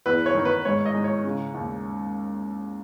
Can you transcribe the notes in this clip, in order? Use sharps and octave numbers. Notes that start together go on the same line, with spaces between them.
E2 B4
C#5
D#3
B4
G#2 C#5
D#5
G#2
C#5
C#3
D#2